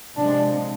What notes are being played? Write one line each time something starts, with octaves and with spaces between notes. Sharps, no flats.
C3 F3 G#3 D4